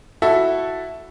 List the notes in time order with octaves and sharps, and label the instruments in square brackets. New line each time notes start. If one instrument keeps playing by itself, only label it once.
[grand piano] E4 F#4 A4 E5